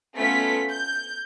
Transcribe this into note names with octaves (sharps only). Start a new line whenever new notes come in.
A3 B3 C#4 F4 B6
G6